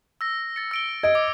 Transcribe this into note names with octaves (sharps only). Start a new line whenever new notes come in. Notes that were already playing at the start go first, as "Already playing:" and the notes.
E6 A#6
A6 C#7
E6 D7 G7
D#5 G#6 D7
D6